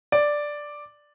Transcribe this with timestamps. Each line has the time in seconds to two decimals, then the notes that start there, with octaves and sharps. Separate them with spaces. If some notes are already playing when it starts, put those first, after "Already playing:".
0.12 D5